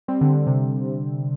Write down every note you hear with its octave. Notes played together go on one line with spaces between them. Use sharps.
G3 C4
D3
D3
C3